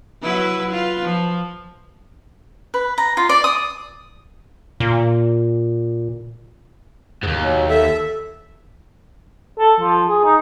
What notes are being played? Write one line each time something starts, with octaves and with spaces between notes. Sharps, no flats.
F#3 E4 B4
F4 B4
F3
B4
A#5
F4
D5
D#6
A#2
D#2 G#2
B2 F#3
A4 E5
A4
F3
G#4
D#4